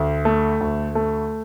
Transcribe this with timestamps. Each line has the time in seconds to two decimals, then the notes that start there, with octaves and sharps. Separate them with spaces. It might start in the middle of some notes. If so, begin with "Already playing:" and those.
Already playing: D2
0.25 A3
0.61 D2
0.95 A3